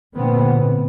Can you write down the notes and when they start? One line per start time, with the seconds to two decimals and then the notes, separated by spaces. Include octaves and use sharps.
0.14 A#2 D3 B3 C4
0.53 A2